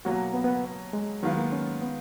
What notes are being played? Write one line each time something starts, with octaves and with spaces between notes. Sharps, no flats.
B2 F#3 A#3 F#4
B3
B3
G#3
D#3 F#3 G#3 B3 F4
A#3
C#4
B3